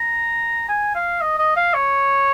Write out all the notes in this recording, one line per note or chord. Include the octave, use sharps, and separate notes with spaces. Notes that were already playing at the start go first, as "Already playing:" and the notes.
Already playing: A#5
G#5
F5
D#5
D#5
F5
C#5